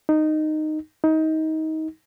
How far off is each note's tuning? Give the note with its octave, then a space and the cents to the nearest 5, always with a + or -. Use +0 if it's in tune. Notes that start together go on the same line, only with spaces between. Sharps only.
D#4 -10
D#4 +25